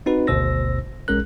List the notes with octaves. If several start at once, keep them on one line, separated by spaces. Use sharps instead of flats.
C4 D#4 F#4 B4
G#1 D2 B2 C5 E6 A#6
A#1 G#3 C#4 A#4 F#6